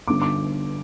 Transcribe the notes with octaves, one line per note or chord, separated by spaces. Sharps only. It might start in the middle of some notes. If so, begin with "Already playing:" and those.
G1 G2 D3 D6
D6